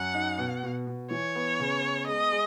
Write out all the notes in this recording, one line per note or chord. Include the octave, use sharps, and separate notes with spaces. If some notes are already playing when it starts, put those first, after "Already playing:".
Already playing: F#2 F#5
D#4
B2
B2
B2
E3 C#5
B3
C#3
B3
G#3 D#5
G#3